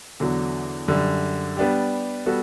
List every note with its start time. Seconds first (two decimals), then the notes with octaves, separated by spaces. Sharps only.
0.20 E2 D3 F#3
0.88 F#2 D3 G3
1.57 G3 B3 D4 G4
2.26 G3 B3 F#4 A4